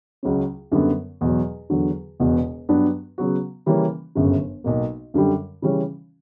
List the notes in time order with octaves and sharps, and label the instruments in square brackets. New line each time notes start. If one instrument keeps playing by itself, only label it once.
[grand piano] C#2 C#3 F#3 C#4
F#2 D3 G3 B3
E2 B2 F#3
E2 D3 F#3
E1 E2 B2
G2 F#3 B3 D4
C#3 F#3 B3 F#4
C#3 E3 G3 A#3 C#4
G1 F#2 C#3
B1 B2 A#3
F#2 D3 G3
C#3 E3 G3 C#4